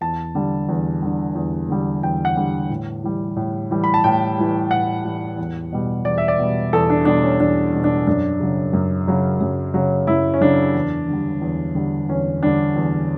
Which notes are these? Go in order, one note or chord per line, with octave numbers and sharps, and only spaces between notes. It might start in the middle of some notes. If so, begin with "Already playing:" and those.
E2 A5
D3 G3
E2
D3 G3
E2
D3 G3
E2 G5
F#5
D3 G3
A2
E3 G3
A2
E3 G3
B5
A5
A2 G5
E3 G3
A2 F#5
E3 G3
E2
B2 G3
E2 D5
E5
D5
B2 G3
E2 A4
D4
B2 G3 D4
C#4
E2 D4
B2 G3
D4
F#2 D4
C#3 F#3
F#2
C#3 F#3
F#2
C#3 F#3
F#2 E4
C#4
C#3 F#3 D4
E2
D3 G3
E2
D3 G3
E2 C#4
D3 G3 D4
E2